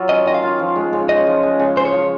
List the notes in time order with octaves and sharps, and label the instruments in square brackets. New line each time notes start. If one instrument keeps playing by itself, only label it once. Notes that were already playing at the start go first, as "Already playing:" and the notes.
Already playing: [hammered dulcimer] F#3 F4
[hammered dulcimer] C#4 [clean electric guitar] D#5
[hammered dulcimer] D#3 [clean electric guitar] D#5
[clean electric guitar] F5
[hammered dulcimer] F4
F3
G#3
C#3
[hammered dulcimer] C#3 [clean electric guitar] D#5
[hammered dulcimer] F3
G#3
C#3
[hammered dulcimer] C#3 [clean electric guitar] C5
[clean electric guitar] C#5
[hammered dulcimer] F3